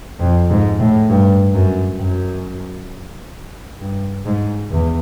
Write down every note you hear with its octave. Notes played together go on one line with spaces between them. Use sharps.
F2
G#2
A2
G2
F#2
F#2
G2
G#2
E2